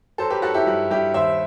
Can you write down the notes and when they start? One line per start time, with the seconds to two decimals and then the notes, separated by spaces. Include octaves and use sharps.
0.18 F#3 A4 C5
0.30 G4 B4
0.42 F#3 F#4 A4
0.54 E4 G4
0.66 G2 F#4
0.91 G2 E4 G4
1.14 D#2 C5 E5